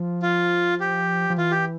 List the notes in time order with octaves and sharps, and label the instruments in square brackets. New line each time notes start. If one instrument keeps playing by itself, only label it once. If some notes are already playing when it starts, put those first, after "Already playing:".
Already playing: [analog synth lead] F3
[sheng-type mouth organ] F4
G4
[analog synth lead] F3
[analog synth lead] E3 [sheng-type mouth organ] F4
[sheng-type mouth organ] G4